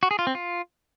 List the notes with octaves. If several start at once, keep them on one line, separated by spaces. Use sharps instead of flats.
F#4
G#4
F4
C4
F4